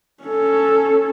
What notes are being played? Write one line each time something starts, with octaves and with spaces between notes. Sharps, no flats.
C#4 A4